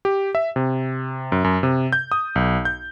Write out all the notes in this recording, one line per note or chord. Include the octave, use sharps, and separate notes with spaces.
G4
E5
C3
F#2
F#2
C3
G6
D#6
B1
G6